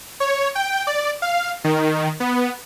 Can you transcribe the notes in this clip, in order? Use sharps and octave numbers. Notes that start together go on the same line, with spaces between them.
C#5
G5
D5
F5
D#3
B3